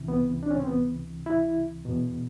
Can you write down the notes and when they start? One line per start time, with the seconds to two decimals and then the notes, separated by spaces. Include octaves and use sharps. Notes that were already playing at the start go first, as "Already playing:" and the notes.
Already playing: C#2 C3 E3
0.08 B3
0.43 D4
0.51 C#4
0.60 C4
0.67 B3
1.26 E4
1.85 E2 B2